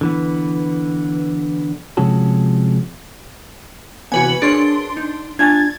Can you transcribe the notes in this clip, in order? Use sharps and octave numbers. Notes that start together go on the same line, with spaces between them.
D3 E3 B3
C3 F3 G#3 C#4 F#4 A4
C3 E3 B3 F#4 B4 G#5
D4 G#4 A#4 C#5 C6
D#4
D4 F4 G#5 G#6 A6